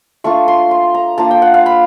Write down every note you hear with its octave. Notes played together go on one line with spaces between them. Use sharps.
A3 D4 F4 C#6
C6
C6
A#5
A#3 D4 F4 A5
G5
F#5
F5
B5